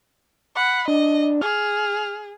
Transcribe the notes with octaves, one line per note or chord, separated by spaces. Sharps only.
F#5 B5
D4 D#5
G#4 F6